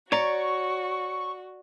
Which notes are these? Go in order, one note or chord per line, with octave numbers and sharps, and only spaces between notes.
F#4 C#5 D5 A#5 C#6